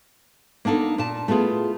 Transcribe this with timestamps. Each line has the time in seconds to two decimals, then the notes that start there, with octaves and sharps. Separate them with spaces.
0.65 A#3 B3 D4 D#4 A4
0.98 A#2 A5
1.28 A3 B3 E4 F4 G#4